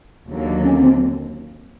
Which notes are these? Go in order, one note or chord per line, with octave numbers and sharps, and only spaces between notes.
D#2 D3 F#3 A#3
C#4
C#4
C4